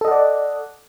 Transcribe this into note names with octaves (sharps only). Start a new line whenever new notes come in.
A4 D5 D#5 F#5